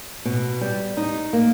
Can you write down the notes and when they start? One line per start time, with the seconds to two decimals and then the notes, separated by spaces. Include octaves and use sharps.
0.25 B2
0.61 G3
0.97 D#4
1.33 A#3